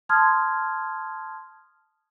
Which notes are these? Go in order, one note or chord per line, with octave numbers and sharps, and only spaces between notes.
A5 C6 D#6 F6 G#6